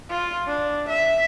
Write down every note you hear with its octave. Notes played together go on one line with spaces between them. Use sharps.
F4
D4
E5